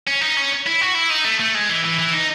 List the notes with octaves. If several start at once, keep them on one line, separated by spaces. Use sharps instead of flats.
C#4
D#4
C#4
E4
F#4
E4
D#4
A3
A3
G#3
E3
E3
E3
D#4